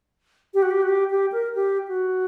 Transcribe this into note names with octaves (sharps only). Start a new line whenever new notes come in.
G4
F#4
G4
F#4
G4
G4
A#4
G4
F#4